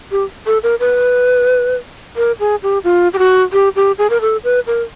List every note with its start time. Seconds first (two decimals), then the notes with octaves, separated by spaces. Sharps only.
0.12 G4
0.46 A4
0.63 A#4
0.80 B4
2.16 A#4
2.40 G#4
2.63 G4
2.84 F4
3.14 G4
3.19 F#4
3.53 G4
3.76 G4
3.98 G#4
4.10 A#4
4.21 A4
4.44 B4
4.67 A#4